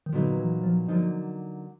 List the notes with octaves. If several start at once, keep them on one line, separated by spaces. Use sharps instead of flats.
D#3
A#2 D3 F#3 B3 D#4
E3
F3
D3 F3 F#3 A#3 D#4